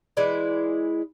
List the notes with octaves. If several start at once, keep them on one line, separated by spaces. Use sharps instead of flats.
E3 G#3 E4 D5